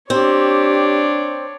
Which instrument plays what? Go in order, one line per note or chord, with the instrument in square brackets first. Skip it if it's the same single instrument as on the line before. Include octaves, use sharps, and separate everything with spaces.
[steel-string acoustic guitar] C4 [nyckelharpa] D4 C#5 [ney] G4